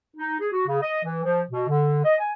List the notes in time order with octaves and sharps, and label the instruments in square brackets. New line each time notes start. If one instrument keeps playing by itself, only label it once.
[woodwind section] D#4
G#4
F#4
C#3
D#5
E3
F3
B2
D3
D#5
G#5